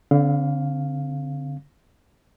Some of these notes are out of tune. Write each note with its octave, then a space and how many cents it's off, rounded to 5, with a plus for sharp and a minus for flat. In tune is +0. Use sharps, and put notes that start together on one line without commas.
D3 -30 C4 +0 F5 +0